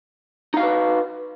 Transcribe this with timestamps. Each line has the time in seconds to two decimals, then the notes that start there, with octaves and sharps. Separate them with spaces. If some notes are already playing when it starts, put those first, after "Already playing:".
0.54 D#4
0.57 F5
0.60 F#4
0.63 B4